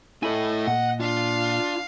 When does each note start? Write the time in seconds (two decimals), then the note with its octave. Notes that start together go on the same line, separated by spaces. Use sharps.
0.23 A3 E4 A4 D#5 G#5 B5
0.67 A#2 F#5
1.00 D4 F4 F5